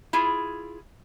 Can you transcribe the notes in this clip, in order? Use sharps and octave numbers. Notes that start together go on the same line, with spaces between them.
E4 F4 G#4